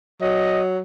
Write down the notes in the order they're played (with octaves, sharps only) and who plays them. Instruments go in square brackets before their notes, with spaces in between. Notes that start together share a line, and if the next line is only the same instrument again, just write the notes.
[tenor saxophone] F#3 [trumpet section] D#5